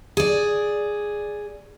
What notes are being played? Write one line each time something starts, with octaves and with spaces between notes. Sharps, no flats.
G#4 D5